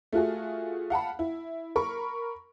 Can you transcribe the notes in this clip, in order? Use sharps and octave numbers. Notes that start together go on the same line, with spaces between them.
A3 F4 F#4 G#4
F5 F#5 A5 B5
E4
A#4 B5 C#6